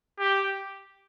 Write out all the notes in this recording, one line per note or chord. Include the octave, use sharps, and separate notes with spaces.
G4